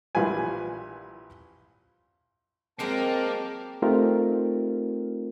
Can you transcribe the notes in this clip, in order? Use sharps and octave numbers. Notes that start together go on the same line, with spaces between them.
A#1 E3 G3 F4 B4 G#5
F#3 G#3 A#3 C4 F#4 A#4 G5 A5
A3 C4 D#4 F4 G4 A#4